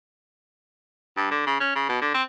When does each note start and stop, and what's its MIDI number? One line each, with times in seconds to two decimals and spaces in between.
1.17 1.31 43
1.31 1.42 50
1.46 1.57 49
1.60 1.70 61
1.75 1.86 49
1.89 1.98 47
2.01 2.12 50
2.14 2.22 60